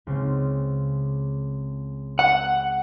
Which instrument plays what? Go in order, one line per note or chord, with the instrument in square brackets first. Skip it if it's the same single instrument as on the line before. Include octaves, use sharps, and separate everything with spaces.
[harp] C#2 C#3 C4
[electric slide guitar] F#5